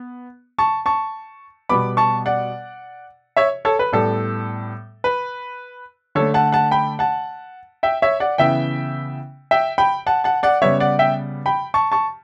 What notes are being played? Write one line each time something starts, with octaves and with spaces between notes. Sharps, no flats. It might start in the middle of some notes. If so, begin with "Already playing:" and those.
Already playing: B3
A5 C#6
A5 C#6
B2 G3 B3 B5 D6
A5 C#6
D5 F#5
C#5 E5
A4 C#5
B4
A2 G3 B3 A4
B4
D3 A3 A4 C#5
F#5 A5
F#5 A5
G5 B5
F#5 A5
E5 G5
C#5 E5
D5 F#5
C#3 E3 B3 E5 G5
E5 G5
G5 B5
F#5 A5
F#5 A5
D5 F#5
C#3 G3 B3 C#5 E5
D5 F#5
E5 G5
G5 B5
A5 C#6
A5 C#6